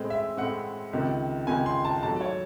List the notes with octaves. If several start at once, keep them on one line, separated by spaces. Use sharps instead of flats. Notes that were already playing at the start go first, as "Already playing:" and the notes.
Already playing: A2 G#3 C4
E5
A2 G#3 C4 F#5
C#2 C3 D#3
C#2 C3 D#3 G#5
C6
A5
G#2 F#3 A3 A5
C#5